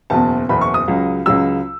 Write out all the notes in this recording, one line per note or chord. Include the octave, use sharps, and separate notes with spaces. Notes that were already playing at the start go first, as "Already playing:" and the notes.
F#1 E2 B2 A5
F#1 E2 B2 B5
C#6
D#6
C#2 C#3 F#3
C#2 C#3 F#3 E6